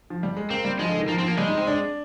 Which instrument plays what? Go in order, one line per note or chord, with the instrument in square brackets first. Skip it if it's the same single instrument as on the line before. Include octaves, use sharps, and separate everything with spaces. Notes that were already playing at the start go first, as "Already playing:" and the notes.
[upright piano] F3
G3
G#3
[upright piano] A#3 [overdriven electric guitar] C4
[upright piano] G3
[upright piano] F3 [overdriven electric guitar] G#3
[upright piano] D3
D#3
[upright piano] F3 [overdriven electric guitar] A#3
[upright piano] F3 [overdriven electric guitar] C4
[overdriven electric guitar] A#3
[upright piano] G3 [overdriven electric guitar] G#3
[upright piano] D#4
C4
D4